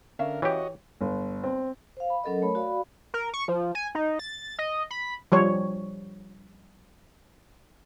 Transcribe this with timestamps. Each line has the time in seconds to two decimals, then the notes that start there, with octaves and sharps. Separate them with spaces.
0.19 D3 C#4 A#4 E5 F5
0.42 E3 F#4 G4 C#5 D#5
1.01 G1
1.44 C4
1.97 C5 F5
2.10 B5
2.24 F#3 C#4 A4 A#4 D#5
2.42 A3 A#4 C#5 B5
2.55 F#4 D5 F5 B5
3.14 A#4
3.34 C#6
3.48 F3
3.75 G#5
3.95 D#4
4.19 A6
4.59 D#5
4.91 B5
5.32 F3 G3 C#5